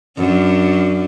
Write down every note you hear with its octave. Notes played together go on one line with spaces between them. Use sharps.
F#2 D4